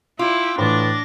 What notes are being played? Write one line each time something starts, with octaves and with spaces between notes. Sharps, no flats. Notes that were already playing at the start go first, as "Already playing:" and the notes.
E4 F4 G5 D6 E6
A2 E3 D4 D6 A6 A#6